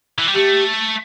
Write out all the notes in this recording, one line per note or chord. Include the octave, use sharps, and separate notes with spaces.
E3
G3
A3 G4